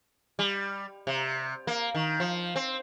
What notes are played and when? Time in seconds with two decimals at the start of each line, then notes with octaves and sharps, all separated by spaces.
0.39 G3
1.07 C3
1.67 A#3
1.95 D#3
2.20 F3
2.56 C4